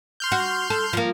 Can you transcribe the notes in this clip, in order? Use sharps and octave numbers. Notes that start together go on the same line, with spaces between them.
C6 F6 G6
F#4
A4
F3 A#3